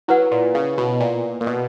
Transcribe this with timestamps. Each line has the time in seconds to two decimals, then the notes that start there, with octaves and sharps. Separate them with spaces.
0.08 F#3 E4 B4 F#5
0.32 A#2
0.55 C#3
0.78 B2
1.00 A#2
1.41 A#2
1.47 B2